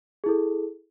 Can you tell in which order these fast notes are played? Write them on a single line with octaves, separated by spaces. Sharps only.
G#4 E4 A4